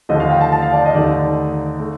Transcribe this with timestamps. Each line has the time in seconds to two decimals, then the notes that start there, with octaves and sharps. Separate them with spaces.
0.09 D#2 D3 F3 A3 D#5
0.20 F5
0.31 G5
0.41 A5
0.52 A5
0.62 F5
0.73 D5
0.86 D#5
0.95 D#2 D3 A3 D#4 D5
1.79 A3